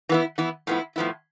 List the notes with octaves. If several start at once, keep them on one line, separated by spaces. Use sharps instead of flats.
E3 B3 E4
E3 B3 E4
A2 F3 B3 E4
A2 F3 B3 E4